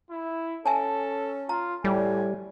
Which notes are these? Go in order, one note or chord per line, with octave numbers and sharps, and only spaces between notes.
E4
C#4 A4 E5 G#5 A5
F4 A#5
A2 G3 G#5